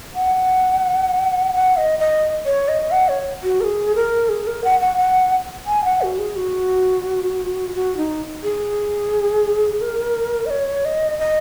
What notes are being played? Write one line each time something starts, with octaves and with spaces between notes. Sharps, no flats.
F#5
F#5
D#5
D#5
C#5
D#5
F#5
C#5
F#4
A#4
G#4
A#4
G#4
A#4
F#5
F#5
F#5
G#5
F#5
F#4
G#4
F#4
F#4
D#4
G#4
A#4
D#5
C#5
D#5
D#5